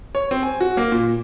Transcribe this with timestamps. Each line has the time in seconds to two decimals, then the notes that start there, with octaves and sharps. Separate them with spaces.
0.15 C#5
0.31 C4
0.43 G#5
0.61 F#4
0.77 A#3
0.92 A#2